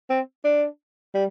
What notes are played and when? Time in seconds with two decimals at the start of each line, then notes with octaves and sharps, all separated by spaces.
0.10 C4
0.44 D4
1.14 G3